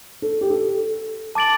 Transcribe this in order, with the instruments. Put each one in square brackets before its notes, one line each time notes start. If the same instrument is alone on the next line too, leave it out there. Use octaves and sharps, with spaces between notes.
[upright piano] A4
G4
A4
[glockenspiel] A5 D6 A6 D7 F#7